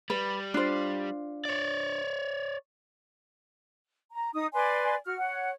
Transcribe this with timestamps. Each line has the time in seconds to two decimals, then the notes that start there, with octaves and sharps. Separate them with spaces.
0.10 G3 B4
0.54 D4 F4 C5
1.45 C#5 D5
4.12 A#5
4.34 D#4 D#6
4.53 B4 D5 G#5 C6
5.05 F#4 F6
5.18 C#5 F#5